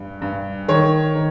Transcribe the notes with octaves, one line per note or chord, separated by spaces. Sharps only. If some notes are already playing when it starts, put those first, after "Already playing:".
Already playing: G2
G2
D#3 C#5
D#3